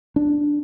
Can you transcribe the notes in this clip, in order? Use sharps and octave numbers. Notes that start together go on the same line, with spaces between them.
D4